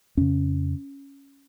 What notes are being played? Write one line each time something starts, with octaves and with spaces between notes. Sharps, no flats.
F2 C#3 C#4